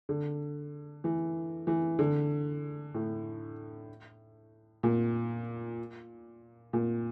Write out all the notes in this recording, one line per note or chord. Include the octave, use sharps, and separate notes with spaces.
D3
E3
E3
D3
A2
A#2
A#2